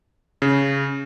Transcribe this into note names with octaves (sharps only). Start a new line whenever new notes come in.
C#3